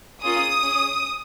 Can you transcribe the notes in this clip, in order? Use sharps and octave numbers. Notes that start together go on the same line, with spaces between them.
A#3 C#4 F4 G#4 D#6
C#4 G#4